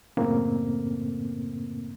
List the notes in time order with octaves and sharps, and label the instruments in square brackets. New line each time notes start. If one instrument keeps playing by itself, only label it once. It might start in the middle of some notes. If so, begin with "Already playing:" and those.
[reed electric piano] F#2 A2 C#3 A3 A#3 C4